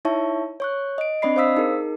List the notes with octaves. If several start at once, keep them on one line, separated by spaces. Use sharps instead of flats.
D#4 E4 C#5 E5 A5 C#6
C#5 C#6 F#6
D#5 D7
C4 D4 D5 D#5 B5 C7
C5 F5 D#6 E6 B6
D#4 G#4 A#4